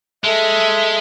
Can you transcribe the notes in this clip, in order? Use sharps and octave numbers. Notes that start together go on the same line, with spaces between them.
G#3 A4 E5